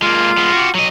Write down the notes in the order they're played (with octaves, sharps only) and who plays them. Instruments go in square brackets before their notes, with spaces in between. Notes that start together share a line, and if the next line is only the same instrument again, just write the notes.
[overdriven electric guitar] G#3 A#3 [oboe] F4
[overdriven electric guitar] G#3 B3
F#4 G4
F#3 D#5